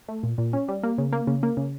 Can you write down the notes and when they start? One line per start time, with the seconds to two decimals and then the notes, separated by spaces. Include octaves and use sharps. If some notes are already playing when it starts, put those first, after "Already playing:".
0.08 A3
0.23 A#2
0.38 A#2
0.53 C#4
0.68 G3
0.83 A#3
0.98 C#3
1.12 A#3
1.27 C#3
1.43 A#3
1.57 C#3